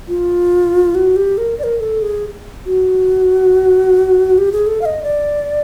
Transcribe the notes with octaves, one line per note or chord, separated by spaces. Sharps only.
F4
F#4
G4
A#4
D5
A#4
A4
G#4
F#4
G4
G#4
A4
F5
D#5
D5